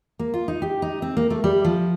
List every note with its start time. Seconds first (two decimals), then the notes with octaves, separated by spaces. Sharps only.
0.19 A#3
0.34 F4
0.48 D#4
0.62 G4
0.82 D#4
1.02 C4
1.17 A#3
1.30 A3
1.44 G3
1.64 F3